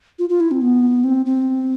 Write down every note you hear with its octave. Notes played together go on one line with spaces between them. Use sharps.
F4
F4
E4
C4
B3
C4
C4